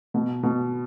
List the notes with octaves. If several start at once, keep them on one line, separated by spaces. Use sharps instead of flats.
B2
B2